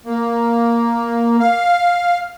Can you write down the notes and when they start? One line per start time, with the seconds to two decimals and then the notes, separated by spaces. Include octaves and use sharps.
0.06 A#3
1.40 F5